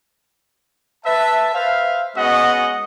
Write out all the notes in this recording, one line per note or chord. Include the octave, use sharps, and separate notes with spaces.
B4 E5 A5
B4 C5 E5 F5
G#3 B3 C#4 F#4 D#5 F#5